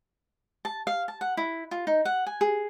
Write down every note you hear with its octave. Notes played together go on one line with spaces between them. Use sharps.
A5
F5
A5
F#5
E4
F4
D#4
F#5
G#5
G#4